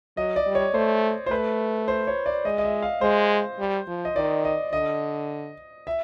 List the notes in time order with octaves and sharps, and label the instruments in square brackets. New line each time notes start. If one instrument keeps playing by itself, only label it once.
[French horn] F#3 [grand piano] D#5
[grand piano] D5
[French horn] G3
[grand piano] C#5
[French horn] A3 [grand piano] C5
[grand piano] C5
[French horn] A3 [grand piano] B4
[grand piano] C5
C#5
D5
[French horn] G#3 [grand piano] D#5
[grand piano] D#5
E5
F5
[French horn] G#3 [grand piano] C5
[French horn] G3
F3
[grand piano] D#5
[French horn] D#3 [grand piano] D5
[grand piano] D#5
[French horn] D3 [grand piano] D#5
[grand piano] E5